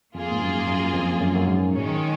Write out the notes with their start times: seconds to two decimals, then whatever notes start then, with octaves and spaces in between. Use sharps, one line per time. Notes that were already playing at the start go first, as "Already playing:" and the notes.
0.15 F2 A#3 F4 G#4
0.32 G#2
0.42 F#2
0.68 F#2
0.94 F2
1.21 F#2
1.35 F#2
1.47 G#2
1.73 A#2 D#3 G#3 C#4